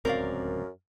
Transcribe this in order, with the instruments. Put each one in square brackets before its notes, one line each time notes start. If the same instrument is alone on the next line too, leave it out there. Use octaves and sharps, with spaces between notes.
[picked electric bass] D1 C#2 C4 [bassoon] F#2 [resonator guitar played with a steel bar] A#4 D5 F5